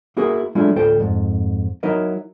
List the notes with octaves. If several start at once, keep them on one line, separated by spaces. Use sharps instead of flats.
A#3 E4 F#4 G#4 A#4
F#3 G#3 A3 D4 E4 F4
D2 A2 F4 A4 C5 G5
F2 G#2
F#3 D#4 E4 A#4 D#5